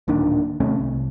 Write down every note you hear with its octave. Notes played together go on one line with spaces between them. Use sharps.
D1 A#2 D#3 D4
D#2 C3 A3 C#4
C2